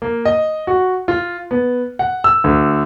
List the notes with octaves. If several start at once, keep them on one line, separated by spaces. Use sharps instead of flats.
A#3
D#5
F#4
F4
B3
F#5
E6
D2